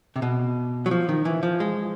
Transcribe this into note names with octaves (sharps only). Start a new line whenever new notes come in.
C3
B2
F#3
F3
D#3
E3
F3
G#3